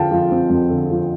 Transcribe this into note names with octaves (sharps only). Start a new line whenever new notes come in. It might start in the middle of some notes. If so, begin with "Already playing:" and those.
Already playing: F2 D3 F3 C4 F5 G5 A5
F3
C4
F2
D3
F3